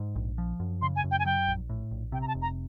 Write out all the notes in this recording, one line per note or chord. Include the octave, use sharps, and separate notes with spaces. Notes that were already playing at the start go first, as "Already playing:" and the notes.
Already playing: G#2
A#1
F3
F#2
C#3 C6
G#5
F#2
G5
G#5
F#3 G5
A#1
A2
A#1
C3 G5
A#5
A5
F1
A#5